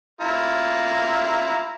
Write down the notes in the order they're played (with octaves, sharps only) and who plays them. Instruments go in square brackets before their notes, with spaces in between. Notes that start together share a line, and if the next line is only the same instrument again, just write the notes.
[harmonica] E4 F4 A#5